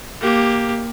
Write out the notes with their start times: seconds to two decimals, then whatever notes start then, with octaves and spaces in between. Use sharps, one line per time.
0.20 A#3 G4